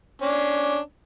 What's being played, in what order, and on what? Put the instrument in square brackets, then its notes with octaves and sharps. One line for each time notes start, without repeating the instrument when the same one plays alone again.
[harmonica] C#4 D4